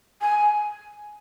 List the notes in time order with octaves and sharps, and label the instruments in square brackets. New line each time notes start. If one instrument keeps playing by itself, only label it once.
[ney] G#5